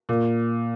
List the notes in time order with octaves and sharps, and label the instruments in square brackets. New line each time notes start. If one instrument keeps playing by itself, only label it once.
[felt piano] A#2